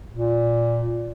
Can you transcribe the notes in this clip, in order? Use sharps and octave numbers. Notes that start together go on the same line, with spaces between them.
A#2